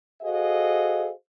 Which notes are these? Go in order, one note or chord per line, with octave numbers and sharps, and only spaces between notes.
F#4 G#4 A4 C5 D#5 F5